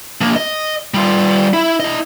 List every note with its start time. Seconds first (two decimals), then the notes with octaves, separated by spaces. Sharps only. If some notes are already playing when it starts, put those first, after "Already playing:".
0.21 F3 A#3
0.36 D#5
0.94 G3 F4
1.53 E4
1.80 E4 D#5